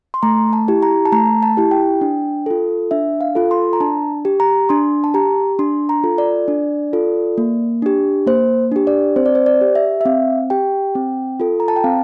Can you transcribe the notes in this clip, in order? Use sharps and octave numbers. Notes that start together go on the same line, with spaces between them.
C6
A3 A#5
A5
E4 G4
A#5
A5
A3 A#5
A5
E4 G4
G5
D4
F4 A4
D4 E5
F5
F4 A4
C6
A#5
D4 A5
G4
A#5
D4 C6
A5
G4 A#5
D4 C6
A#5
F4 A4
D5
D4
F4 A4
A#3
D4 G4
A#3 C5
D4 G4
D5
C4 C5
D5
C5
D5
G4
E5
E5
C4 F5
G4 G5
C4
F4 A4
A#5
A5
G5
C4 F5